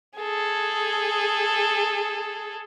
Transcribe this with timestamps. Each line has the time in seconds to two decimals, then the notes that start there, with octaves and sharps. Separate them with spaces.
0.18 G#4 A4